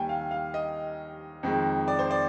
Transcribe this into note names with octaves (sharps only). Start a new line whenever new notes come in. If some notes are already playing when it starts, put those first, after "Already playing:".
Already playing: D#2 D#3 G3 G5 G#5
F5
F5
D#5
F2 D#3 G#3
D5
C5
D5